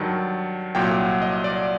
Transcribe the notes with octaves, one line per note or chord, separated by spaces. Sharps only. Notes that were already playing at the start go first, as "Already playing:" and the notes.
Already playing: G2 D#3 F#3 A5
C2 A#2 F#3 G5
D#5
D5